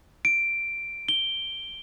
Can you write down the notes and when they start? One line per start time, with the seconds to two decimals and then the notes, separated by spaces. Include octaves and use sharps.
0.25 D7
1.08 G7